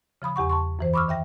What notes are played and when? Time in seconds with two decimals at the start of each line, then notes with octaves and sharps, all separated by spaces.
0.22 C#3 F3 B5 D#6
0.36 E2 G4 F#5 C#6
0.50 A5 C6 C#6
0.79 F#2 E3 C5
0.94 B5 C#6 D6 E6 F6
1.08 D#3 E5 G5 A#6